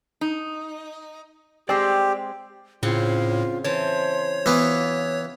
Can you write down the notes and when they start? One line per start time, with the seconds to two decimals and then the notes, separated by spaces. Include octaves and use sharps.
0.21 D#4
1.69 G#3 C4 G4 D5 G5 E6
2.83 A2 C#3 C4 F4 F#5
3.64 E3 C5 C#5 A5
4.46 E3 B3 F4 F#4